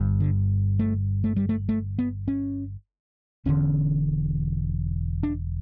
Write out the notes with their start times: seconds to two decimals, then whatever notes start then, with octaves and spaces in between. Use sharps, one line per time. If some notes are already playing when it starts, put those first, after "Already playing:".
Already playing: G1 G2
0.20 D3
0.79 A3
1.24 A3
1.36 G3
1.49 A3
1.69 A3
1.99 B3
2.28 C#4
3.45 E1 E2 D3 C#4
5.23 D4